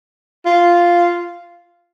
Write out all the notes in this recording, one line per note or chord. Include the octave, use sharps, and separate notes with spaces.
F4